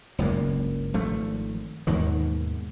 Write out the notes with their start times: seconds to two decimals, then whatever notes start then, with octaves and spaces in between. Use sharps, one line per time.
0.18 F#1 C#2 G2 A#3
0.94 G#1 F3 A3
1.87 D#2 G#2 B2 D#3